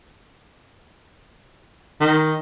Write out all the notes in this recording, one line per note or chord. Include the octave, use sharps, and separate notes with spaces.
D#3